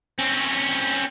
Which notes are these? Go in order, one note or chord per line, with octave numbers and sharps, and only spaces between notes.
C4 C#4